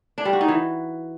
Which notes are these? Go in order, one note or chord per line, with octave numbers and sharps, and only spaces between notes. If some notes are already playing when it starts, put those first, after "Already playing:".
D4
G3
F#4
D#4
E3